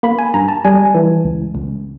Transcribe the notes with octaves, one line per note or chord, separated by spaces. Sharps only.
A#3 B5
G#5
G2 A#5
A5
G3 G#5
E3
C#2
C#2